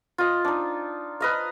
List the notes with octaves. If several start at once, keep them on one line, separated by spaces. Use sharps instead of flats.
F4 D#5
D4 D#4
B4 D#5 F5